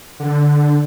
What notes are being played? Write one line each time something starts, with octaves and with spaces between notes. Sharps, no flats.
D3